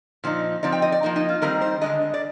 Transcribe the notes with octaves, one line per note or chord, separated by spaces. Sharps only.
A#2 F3 D#4
F3 C4 D#4 D5
G5
D#5
D5
F3 A#3 D#4
D#4
F4
D#3 G3 C4 D#4 A#4
C5
D3 G#3 D4 D#5
D5